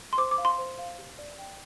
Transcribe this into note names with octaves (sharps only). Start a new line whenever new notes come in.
C6
C5 D6
D6
F5
C6
C5
F5
G4
D5
G5